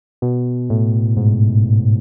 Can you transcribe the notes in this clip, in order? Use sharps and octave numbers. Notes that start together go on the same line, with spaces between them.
B2
A2
G#2